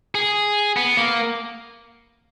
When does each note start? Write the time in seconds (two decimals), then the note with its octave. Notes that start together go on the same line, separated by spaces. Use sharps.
0.15 G#4
0.77 B3
0.98 A#3